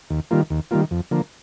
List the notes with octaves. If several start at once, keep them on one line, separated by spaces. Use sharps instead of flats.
D#2
D#3 G3 A#3 F4
D#2
D#3 G3 A#3 F4
F2
D3 F3 A#3